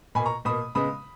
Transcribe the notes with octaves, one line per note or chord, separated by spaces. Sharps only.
B2 A#3 G#5 B5
A#5 C#6
B2 A#3 B5 D#6
C#3 G#3 B3 B5 D#6